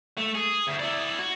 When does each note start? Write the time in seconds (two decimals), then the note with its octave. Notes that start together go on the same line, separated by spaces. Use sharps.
0.18 A3
0.35 G#4
0.68 D2
0.80 E4 D5
1.19 F#4